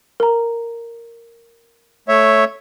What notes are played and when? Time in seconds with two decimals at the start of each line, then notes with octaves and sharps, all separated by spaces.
0.20 A#4 A#5
2.08 A3 C#5 E5